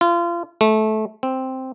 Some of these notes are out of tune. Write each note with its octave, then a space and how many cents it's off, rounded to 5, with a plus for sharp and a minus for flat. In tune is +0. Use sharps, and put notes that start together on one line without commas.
F4 -30
A3 -20
C4 +0